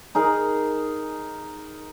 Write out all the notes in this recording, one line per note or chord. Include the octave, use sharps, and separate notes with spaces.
D#4 G#4 A#4